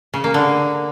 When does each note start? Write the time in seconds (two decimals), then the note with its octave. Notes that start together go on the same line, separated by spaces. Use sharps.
0.14 C#3
0.24 A#3
0.34 D3